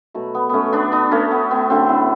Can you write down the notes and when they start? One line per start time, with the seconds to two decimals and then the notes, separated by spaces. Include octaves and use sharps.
0.14 B2 F#3 A3
0.34 B3
0.49 A3 B3 C#4
0.73 B3 D4
0.92 B3 D4
1.11 A3 C#4
1.31 B3
1.51 B3
1.70 C#3 F#3 A3 B3 D4
1.89 C#4 E4